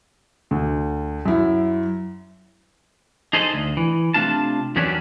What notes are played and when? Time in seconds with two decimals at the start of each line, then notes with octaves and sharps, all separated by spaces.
0.51 D2
1.26 F#2 E4
3.33 D#4 G#4 A4 C5 D#5
3.54 D2
3.77 E3
4.14 C3 A3 D4 F4 A5
4.76 E2 D#3 F#3 G3 C#4 D4